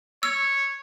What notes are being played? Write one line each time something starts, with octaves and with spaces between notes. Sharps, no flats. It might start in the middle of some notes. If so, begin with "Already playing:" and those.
C#5 E6